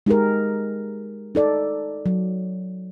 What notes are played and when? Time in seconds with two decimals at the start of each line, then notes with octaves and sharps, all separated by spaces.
0.06 G#3 D#4 G4 G#4 A#4
1.35 D#4 A4 D5
2.06 F#3